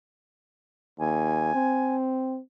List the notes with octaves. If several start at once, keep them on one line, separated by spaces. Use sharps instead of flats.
D#2 G#5
C4